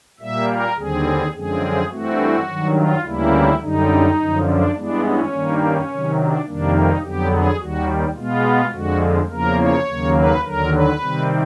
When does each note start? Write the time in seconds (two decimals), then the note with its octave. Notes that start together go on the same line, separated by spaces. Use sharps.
0.20 A#2 G3 A#3 E5
0.48 A#4
0.77 D#2 D3 G3 C4 G#4
1.34 F#2 D3 F3 G#3 C4 G#4
1.91 G2 E3 A3 C4 F#4
2.47 G2 D#3 F#3
2.76 F4
3.04 D2 C#3 E3 G3 A#3 E4
3.61 F#2 D3 G3 D#4
4.18 F#2 D3 F3
4.46 D4
4.75 G2 E3 G#3 B3 D4
5.04 C#4
5.32 G2 D#3 G3 A#3
5.60 C#4
5.89 C3 D#3 F#3
6.17 D4
6.46 F2 C3 D#3 G3 A#3 D4
6.74 D#4
7.02 F2 D3 F#3 B3 G4
7.31 G#4
7.59 D#2 D#3 G3 F#4
8.16 B2 G#3 B3 F4
8.73 F2 D3 F3 G#3 F#4
9.30 E2 C#3 F3 A#3 A#4
9.59 C#5
9.87 D#2 C#3 F#3 A#3
10.15 B4
10.44 D#2 D3 F#3 A#4
10.72 B4
11.01 C3 D#3 G3 C4